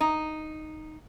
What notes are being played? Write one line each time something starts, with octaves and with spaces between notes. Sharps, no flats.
D#4